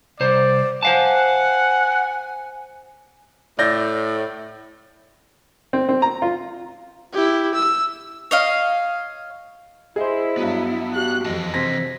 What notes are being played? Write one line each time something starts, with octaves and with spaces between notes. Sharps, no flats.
C2 C5 D5
C5 F5 F#5 G#5 A5
A2 D5 G6 A#6
C4
C4
A#5
F4
E4 G4
E6
C#5 D#5 F5
E4 G#4 C5 D#5 E5
G2 F#3 B3
F#4 G4 F#6
F2 E3 D#5 A5
C3 C5 G#6 A#6 B6